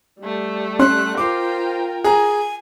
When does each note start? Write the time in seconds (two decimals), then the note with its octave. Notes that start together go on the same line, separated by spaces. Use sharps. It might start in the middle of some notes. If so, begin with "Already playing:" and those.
0.20 G3 A3
0.79 C#4 C6 F#6
1.17 F4 A#4 C5 G5 D6
2.04 G#4 G#5 A#5